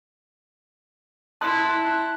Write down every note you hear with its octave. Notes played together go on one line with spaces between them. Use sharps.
E4 A5 C6 F#6